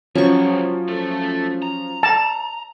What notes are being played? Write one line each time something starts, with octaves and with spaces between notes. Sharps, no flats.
C#2 F3 F#3 C#4 C#6
A3 A4
A#5
A5